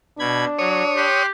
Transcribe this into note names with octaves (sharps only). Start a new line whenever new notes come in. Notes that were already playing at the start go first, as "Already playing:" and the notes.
B2 D4 B5 G#6
F#3 C#5 D#6
G4 G5 C6 F#6